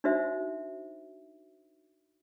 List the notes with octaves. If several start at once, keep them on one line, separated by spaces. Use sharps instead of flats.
D4 D#4 F#4 C5 E5